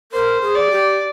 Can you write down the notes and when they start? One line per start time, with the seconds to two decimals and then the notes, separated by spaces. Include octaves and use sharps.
0.12 A#4 C5
0.42 G#4
0.55 D5
0.70 G4